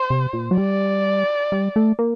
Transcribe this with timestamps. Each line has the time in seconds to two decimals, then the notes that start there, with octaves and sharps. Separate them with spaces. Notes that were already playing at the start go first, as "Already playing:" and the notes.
Already playing: C5
0.10 C3
0.33 A#2
0.51 F#3
0.58 G3 D5
1.52 G3
1.76 A3
1.99 A#3